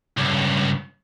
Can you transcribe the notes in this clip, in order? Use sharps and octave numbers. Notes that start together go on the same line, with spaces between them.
C#2 G2